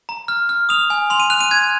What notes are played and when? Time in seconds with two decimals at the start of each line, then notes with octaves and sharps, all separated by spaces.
0.09 A#5
0.28 F6
0.49 F6
0.69 D#6 F7
0.90 G#5
1.10 C6 F7
1.20 D#7
1.30 F#6 F7
1.41 D#7
1.51 F#6 G#6